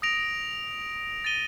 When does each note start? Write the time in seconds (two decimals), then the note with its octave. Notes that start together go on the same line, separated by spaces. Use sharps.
0.02 D#6 A#6 D7 F7
1.24 A6 D#7 G7